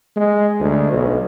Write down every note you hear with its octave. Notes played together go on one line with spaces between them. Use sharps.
G#3
D2
B1